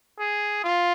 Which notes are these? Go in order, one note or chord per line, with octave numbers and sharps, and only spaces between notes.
G#4
F4